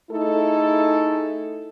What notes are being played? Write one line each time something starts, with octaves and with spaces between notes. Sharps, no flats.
A3 D#4 E4 G#4 A4